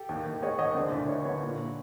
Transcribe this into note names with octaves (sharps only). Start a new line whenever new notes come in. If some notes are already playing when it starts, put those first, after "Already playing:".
Already playing: G4 A4
D#2
D#2
G#3 C#5 D#5
D#2 C#5 D#5
D3 C5 D5
D2 D5 E5
D2 C#5 D#5
D3 B4 C#5
A#2
A#2